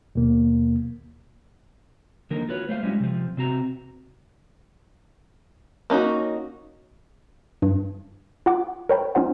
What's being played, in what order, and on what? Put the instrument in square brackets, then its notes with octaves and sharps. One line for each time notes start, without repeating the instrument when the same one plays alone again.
[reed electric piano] D#2 B2 A#3
[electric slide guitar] D3 D#3 F3 A#3 D#4 A#4
F4 F#4 B4 C#5
A3 C5 F5
G3 G#3 C#4 E4 F#4
C3 F3
C3 C4 F#4 A#5
[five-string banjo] A#3 C#4 D#4 F#4
[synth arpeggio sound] G2
F4 F#5 D6
A#4 C#5 G5 B5
C#4 D#4 F4 C5 F#5